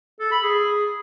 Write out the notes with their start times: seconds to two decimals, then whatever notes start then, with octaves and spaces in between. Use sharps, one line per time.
0.20 A4
0.32 B5
0.43 G#4